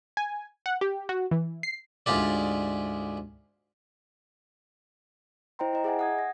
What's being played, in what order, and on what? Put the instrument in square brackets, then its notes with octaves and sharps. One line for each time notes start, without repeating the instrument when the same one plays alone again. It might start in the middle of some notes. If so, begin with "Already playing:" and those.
[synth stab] G#5
F#5
G4
F#4
E3
C7
[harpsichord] D2 G#2 F4 G4 D5
[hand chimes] E4 C5 D#5 G5 A#5 C6
E4 D#5 A#5
G#4 D#5 E5 F#5 G#5
F#5 D#6 G#6
A#6